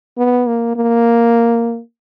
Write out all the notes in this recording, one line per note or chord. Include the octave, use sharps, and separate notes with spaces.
B3
A#3
A#3